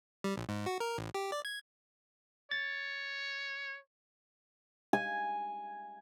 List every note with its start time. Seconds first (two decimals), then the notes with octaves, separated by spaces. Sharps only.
0.24 G3
0.37 A#1
0.49 G#2
0.66 F#4
0.80 A#4
0.98 A1
1.14 G4
1.32 D5
1.45 G#6
2.51 C#5 A6
4.93 G#5